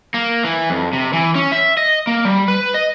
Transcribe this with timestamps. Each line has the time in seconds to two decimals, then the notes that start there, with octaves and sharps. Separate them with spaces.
0.14 A#3
0.44 E3
0.70 F2
0.93 C3
1.13 E3
1.35 C#4
1.52 E5
1.77 D#5
2.07 A#3
2.25 G3
2.48 B4
2.74 D#5